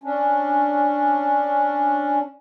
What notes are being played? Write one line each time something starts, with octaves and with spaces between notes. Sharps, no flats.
C#4 D4